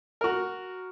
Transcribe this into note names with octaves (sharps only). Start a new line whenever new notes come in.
F#4 A#4